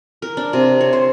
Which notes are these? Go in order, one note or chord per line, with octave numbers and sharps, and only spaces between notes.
A#4
D4
C3
C#5
C5